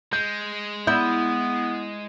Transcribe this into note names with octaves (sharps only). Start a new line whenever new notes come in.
G#3 G6
B3 E4 G6